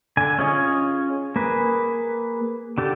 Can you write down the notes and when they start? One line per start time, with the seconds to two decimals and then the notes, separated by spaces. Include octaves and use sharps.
0.17 D3 G#5
0.39 C#4 F4 G#4 C#5 D#5
1.36 A#3 G#4 B4
2.78 D3 G4 A4